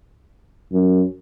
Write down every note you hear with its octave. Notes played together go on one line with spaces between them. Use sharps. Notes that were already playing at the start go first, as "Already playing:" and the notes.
F#2